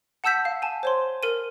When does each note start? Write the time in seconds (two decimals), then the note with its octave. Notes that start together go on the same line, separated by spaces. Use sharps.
0.24 F#5 A5 E6 G6 B6
0.45 F5
0.62 G#5 A5
0.83 C5 C#5 C6
1.23 A#4 D#7